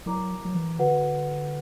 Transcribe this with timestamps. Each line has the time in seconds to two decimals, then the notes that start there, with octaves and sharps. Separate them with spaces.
0.06 F#3 E4 A#4 D5 A#5 D6
0.45 F#3
0.55 E3
0.79 D3 F#4 B4 F#5